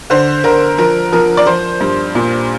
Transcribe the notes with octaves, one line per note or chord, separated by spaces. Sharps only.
D3 C5
D3 A#4
F3 A#4
F3 A#4
D5
F3 C5
G2
A#2